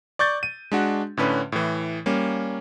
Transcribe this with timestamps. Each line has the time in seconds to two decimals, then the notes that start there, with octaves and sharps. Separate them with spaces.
0.19 D5 C#6 G6 A6
0.43 D#7
0.72 G#3 D4 F#4
1.17 A2 D3 C#4 B4
1.52 A2 E3
2.06 G3 A#3 C#4